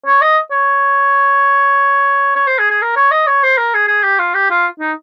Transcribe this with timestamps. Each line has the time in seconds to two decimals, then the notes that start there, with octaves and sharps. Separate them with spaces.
0.06 C#5
0.21 D#5
0.51 C#5
2.36 C#5
2.47 C5
2.58 G#4
2.70 G#4
2.82 A#4
2.96 C#5
3.11 D#5
3.27 C#5
3.43 C5
3.57 A#4
3.74 G#4
3.88 G#4
4.04 G4
4.19 F4
4.34 G4
4.50 F4
4.80 D#4